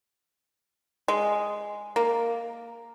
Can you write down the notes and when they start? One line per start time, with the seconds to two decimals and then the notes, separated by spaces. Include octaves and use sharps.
1.08 G#3
1.96 A#3